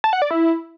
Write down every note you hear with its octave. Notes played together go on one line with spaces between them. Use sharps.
A5
F#5
D5
E4